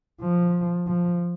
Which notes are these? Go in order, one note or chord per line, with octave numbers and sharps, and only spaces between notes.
F3
F3